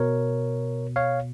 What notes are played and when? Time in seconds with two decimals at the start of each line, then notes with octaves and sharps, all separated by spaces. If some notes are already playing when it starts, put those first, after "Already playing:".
Already playing: B2 A#4 C#5
0.96 C#5 F5